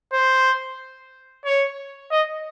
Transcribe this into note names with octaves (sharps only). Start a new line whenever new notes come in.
C5
C#5
D#5